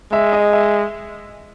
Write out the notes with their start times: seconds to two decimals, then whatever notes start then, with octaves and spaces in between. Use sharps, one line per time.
0.12 G#3 E5
0.33 D#5
0.53 E5